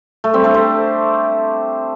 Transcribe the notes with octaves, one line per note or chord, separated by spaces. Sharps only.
A3
G3 C4
A3 D4
G4 C5